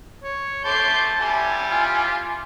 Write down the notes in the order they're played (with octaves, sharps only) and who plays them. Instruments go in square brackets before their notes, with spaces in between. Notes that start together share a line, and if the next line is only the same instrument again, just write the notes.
[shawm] C#5
[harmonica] A3 C6 D6 [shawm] A5 [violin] G6 C7
[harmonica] G3 E4 G4 [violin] G#5
[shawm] F4